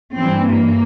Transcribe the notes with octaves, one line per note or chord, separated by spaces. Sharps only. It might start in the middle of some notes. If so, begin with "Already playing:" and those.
G2 E3 C4
A#3